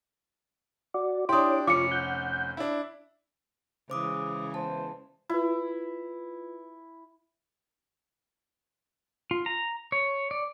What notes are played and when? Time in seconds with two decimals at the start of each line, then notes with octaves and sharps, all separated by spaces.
0.94 F#4 D5
1.29 D4 E4 G4 C#5 C6 D6 D#6
1.67 F1 C#4 F4 C#6 D6 C#7
1.92 F#5 G6
2.57 D4 E4
3.90 C#3 E3 G#3 C5 D6 D#6
4.54 E2 C5 A5
5.29 E4 F4 B4
9.31 F4
9.46 A#5
9.92 C#5
10.31 D5